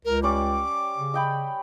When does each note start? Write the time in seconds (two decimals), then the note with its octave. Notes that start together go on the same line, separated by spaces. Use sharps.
0.05 C#2 A#4
0.23 G3 C#4 D5 D6
0.98 C#3
1.14 D#5 G5 B5